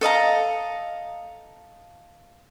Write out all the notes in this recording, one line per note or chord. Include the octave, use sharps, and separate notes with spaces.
A4 D#5 F5 A#5